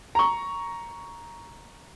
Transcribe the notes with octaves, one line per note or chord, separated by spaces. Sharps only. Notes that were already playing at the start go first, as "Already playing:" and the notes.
A#5 C#6